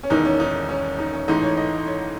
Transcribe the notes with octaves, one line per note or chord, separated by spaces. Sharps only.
C#4
E1 E2 D#3 D#4
C#4
D#4
C#4
D#4
C#4
A1 G#2 E3 A3 D#4
C#5
D#5
C#5